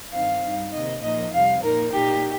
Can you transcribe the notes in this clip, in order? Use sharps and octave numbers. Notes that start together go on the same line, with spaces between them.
G2 D#3 C4 D#4 F5
G2 G3 D#4
C3 D#3 A#3 D#5
A#2 F3 A#3 D#4 D#5
F2 C3 G3 F5
A#2 A#3 D#4 A#4
A#2 A#3 D#4 G4